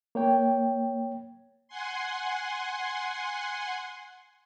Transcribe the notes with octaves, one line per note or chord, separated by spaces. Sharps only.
A#3 C#5 G5
F#5 G#5 C6